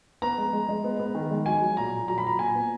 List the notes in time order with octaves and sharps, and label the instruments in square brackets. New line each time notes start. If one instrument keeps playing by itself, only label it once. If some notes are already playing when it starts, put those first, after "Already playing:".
[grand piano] B3 A#5
G#3
G#3
G#3
B3
B3
D#3
G#3
F#3 G#5
F#3
A#2 A#5
A#2
F#3 A#5
B5
A#2 A#5
A#2 G#5
B3